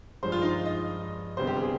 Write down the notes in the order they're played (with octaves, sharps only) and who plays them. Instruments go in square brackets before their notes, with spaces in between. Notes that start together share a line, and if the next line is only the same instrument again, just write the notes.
[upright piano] G2 F3 G#3 C5
F4
D#4
F4
D#5
D2 C3 G3 B3 C5
G4
G#4